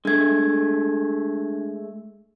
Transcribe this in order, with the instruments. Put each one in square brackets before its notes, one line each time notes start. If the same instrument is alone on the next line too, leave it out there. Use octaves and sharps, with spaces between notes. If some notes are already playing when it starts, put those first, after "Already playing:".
[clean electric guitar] G#3 A3 [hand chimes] D4 G#6